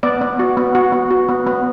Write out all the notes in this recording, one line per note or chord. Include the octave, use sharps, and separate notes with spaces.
B3 D5
B3
F#4
B3
F#4
B3
F#4
B3
B3